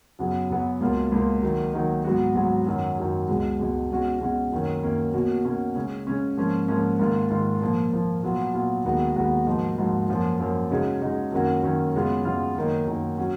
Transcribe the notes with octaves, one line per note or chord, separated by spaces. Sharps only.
F#2 C#3 F#3 B3
F#2 C#3 F#3 B3
C#2 B2 A#3 F4
C#2 B2 A#3 F4
D#3 F#3 A#3 D#4
D#3 F#3 A#3 D#4
G#2 F#3 B3 F#4
G#2 F#3 B3 F#4
F#2 D#3 F#3
F#2 D#3 F#3
C#2 B2 G#3
C#2 B2 G#3
B2 G#3 C#4 F#4
B2 G#3 C#4 F#4
F#2 D#3 A#3 C#4
F#2 D#3 A#3 C#4
B2 A#3 C#4 F#4
B2 A#3 C#4 F#4
C#3 G#3 C#4
C#3 G#3 C#4
G#2 F3 A#3 C#4
G#2 F3 A#3 C#4
G#2 D#3 A#3 F4
G#2 D#3 A#3 F4
A#2 F3 A#3
A#2 F3 A#3
A#2 F#3 B3 F4
A#2 F#3 B3 F4
D#2 D#3 G#3 B3 F#4
D#2 D#3 G#3 B3 F#4
G#2 F3 A#3 D#4 F#4
G#2 F3 A#3 D#4 F#4
F#2 F3 A#3
F#2 F3 A#3
C#3 G#3 D#4 F#4
C#3 G#3 D#4 F#4
F#2 D#3 A#3 C#4 F#4
F#2 D#3 A#3 C#4 F#4
F#2 C#3 G#3 B3 F4
F#2 C#3 G#3 B3 F4
F#2 D#3 A#3 D#4
F#2 D#3 A#3 D#4
F#3 C#4 F#4